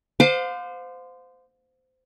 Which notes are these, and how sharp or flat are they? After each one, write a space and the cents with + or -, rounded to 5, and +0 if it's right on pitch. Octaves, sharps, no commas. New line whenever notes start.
C5 -20 F5 +35 D6 +35